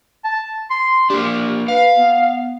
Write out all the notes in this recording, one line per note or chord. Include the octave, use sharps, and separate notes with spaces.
A5
C6
A#3 D4 G4
B4 F5
B3